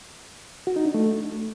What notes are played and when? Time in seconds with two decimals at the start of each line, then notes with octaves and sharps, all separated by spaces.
0.67 F#4
0.76 D#4
0.85 D4
0.94 A3